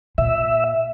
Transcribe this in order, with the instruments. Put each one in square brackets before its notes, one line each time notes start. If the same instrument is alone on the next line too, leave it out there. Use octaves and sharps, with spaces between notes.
[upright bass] A#2 [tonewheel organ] E5